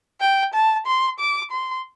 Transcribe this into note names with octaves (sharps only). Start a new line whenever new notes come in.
G5
A5
C6
D6
C6